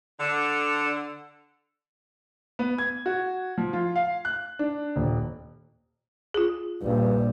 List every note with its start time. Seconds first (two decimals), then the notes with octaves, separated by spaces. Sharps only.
0.19 D3
2.59 B3
2.78 G#6
3.06 F#4
3.58 F3
3.73 F4
3.96 F5
4.25 F#6
4.59 D4
4.96 D#1
6.34 F4 G#4
6.82 A#1 G2 G3